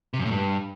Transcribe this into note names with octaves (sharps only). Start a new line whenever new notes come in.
C3
F#2
A2
G2